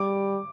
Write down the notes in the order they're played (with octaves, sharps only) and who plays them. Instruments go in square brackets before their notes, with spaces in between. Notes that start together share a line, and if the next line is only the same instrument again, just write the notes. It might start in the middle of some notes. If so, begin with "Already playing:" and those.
Already playing: [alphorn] G3 [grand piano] D6